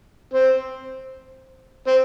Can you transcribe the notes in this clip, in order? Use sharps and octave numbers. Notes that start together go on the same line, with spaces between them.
C4
C4